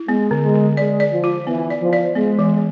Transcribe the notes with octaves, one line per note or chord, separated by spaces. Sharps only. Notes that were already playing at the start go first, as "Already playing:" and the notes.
Already playing: E4
G#3 B3
D3
G#3
D3
G#3 D5
D5
F3
F4
E3 B3
D5
F3
D5
G#3 B3
E3